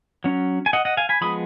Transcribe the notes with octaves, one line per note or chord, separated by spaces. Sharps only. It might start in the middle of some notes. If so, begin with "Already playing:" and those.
F#3 C#4
G#5
D#5 F#5
D#5 F#5
F5 G#5
G#5 B5
F3 G#3 B3 B5 D#6